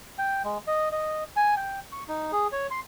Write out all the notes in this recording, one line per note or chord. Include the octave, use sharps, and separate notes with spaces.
G5
G#3
D#5
D#5
G#5
G5
C#6
D#4
G#4
C#5
C6